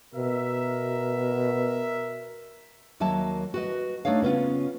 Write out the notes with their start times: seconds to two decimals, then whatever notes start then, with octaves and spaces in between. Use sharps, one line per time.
0.15 B2 A#4 E5
3.00 D#2 F#3 A#3 E5 A5
3.54 F#4 B4 D#5
4.05 A3 D4 D#4 C#5 F5
4.22 C#3 B3 C#4 F4